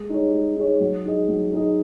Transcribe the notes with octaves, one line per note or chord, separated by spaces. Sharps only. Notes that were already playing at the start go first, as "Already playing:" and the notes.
Already playing: G#3
D#4 G#4 C#5
G#3
D#4 G#4 C#5
F#3
D#4 G#4 D#5
F#3
D#4 G#4 D#5